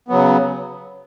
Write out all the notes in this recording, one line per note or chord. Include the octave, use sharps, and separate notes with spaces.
C#3 F#3 B3